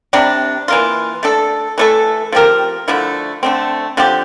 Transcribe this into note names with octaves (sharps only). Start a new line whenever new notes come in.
C3 G3 D4
E3 A#3 F4
A3 D4 A4
E3 A3 E4 A4
F3 C4 G4 A#4
D3 F3 A3 E4
D3 A3 C4
D3 F3 C4 G4